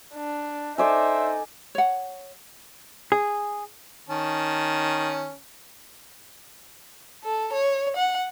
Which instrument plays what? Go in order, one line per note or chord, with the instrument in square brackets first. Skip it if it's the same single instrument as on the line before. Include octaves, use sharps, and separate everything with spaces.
[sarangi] D4
[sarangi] D#4 [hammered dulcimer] A4 D5 G#5 [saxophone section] C5 E5
[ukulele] C#5 F#5
[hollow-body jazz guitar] G#4
[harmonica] D#3 C#4 A5
[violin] A4
C#5
F#5